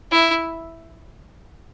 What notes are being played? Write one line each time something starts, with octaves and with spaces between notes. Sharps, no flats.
E4